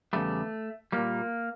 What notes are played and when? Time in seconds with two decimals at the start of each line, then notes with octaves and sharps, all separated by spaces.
0.13 E2 C#3 G3 A3
0.92 A#2 G3 A#3